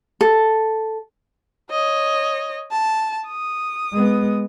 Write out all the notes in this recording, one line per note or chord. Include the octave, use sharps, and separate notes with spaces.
A4
C#5 D#5
A5
D#6
G#3 B3